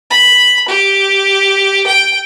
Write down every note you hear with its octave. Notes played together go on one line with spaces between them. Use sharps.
B5
G4
G5